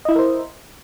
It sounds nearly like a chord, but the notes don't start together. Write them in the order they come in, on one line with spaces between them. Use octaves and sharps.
D#5 E4 E5 A#4 C5